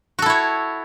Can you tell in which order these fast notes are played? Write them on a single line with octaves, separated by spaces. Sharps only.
F#4 A4 E4 C#5